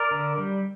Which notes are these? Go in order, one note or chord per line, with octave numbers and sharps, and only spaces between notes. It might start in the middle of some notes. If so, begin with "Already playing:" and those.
Already playing: A#4 D5
D3
G3